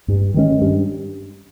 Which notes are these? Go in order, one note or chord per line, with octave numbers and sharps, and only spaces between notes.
G2
D#3 G#3 C#4
G2